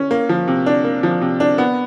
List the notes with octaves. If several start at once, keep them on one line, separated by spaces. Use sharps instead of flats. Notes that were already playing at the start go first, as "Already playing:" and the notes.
Already playing: C#4
A#3
F3
C3
D4
A#3
F3
C3
D4
B3